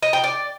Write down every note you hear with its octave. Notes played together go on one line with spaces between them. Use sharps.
D#5
G5
D5